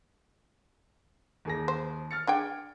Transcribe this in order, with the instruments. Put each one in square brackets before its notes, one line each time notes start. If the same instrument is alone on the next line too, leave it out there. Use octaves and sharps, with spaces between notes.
[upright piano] D#2 G#4 A#6
[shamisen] C5
[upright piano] F6 A6 C#7
[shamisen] D4 G#4 G5